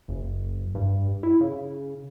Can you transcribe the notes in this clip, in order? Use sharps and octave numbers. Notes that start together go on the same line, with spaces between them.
F#1
G2
E4
C#3